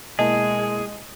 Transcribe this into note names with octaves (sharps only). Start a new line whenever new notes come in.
B2 G#3 A#3 E4 G#4 D#5 A5